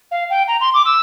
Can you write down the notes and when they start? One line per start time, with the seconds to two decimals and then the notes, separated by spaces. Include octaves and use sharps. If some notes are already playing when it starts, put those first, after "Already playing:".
0.11 F5
0.30 G5
0.47 A#5
0.60 C6
0.73 D6
0.85 E6